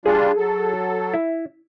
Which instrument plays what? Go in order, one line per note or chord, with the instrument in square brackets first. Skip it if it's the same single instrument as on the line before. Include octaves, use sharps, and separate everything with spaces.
[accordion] G3 D4 F4 [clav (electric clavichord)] G#4
[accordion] F#3 A4
[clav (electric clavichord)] E4